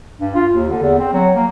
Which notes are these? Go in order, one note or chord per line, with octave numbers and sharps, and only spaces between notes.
G2
F4
D#2
D3
E2
C4
F#3
A#3